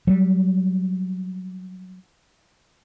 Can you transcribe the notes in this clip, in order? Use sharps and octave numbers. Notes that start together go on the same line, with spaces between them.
F#3 G3